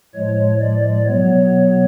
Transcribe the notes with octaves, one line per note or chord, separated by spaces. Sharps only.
A2 F3 G#3 C#5
D5
B2 F#3 B3 C#5